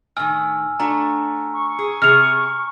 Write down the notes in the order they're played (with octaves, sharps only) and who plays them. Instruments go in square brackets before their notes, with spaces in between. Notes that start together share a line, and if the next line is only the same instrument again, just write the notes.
[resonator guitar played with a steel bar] A2 D#3 [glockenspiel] G#5 E6 F6
[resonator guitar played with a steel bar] A3 D4 F#4 [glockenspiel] A#5
[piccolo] C#6
[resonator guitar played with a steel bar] G#4
[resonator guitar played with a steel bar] C3 G#4 [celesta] F6 F7